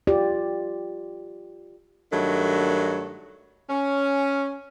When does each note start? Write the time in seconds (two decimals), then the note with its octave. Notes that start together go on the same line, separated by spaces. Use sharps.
0.07 F4 G4 D5
2.12 G2 D#3 F#3 A3
3.70 C#4